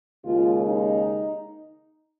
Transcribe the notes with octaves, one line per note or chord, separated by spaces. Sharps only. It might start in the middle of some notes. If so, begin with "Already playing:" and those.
D#2 C#3 G#3 F4
D#4